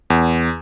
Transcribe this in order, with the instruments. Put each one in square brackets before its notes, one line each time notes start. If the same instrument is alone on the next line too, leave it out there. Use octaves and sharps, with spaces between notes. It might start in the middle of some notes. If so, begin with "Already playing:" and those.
[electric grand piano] E2